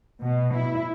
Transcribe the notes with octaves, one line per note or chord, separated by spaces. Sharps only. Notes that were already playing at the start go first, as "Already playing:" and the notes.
B2
E4